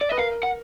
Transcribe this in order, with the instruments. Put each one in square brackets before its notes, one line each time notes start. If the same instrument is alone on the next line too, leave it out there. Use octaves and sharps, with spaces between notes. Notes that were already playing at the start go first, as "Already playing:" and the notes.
[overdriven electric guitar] D5
[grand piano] B4 [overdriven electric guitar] D#5
[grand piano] A#4 [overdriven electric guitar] F5
[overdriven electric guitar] F#5